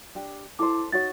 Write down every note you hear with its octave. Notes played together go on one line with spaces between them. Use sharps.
D4 G4
E4 A4 C5 D6
D#4 F#4 C#5 A6